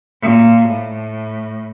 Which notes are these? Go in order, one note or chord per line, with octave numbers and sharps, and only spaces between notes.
A#2
A2